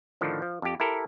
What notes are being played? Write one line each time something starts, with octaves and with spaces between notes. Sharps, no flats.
A2 D3 D#3 F3
F3
F2 G4
E4 G4 A4 A#4